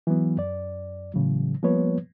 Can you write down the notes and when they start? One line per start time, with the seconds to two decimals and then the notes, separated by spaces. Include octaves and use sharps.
0.07 E3 F#3 B3
0.38 F#2 D5
1.14 A2 C#3 E3 F#3
1.63 F3 G3 A#3 B3 B4 C#5